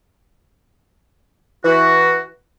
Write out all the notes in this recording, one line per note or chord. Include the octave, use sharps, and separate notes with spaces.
E3 F#4